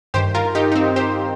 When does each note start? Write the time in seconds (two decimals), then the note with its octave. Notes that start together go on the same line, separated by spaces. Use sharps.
0.14 G2 D#3 G4 C5
0.35 F4 A#4
0.55 D#4 G4
0.72 D#4
0.75 C4
0.96 G4 C5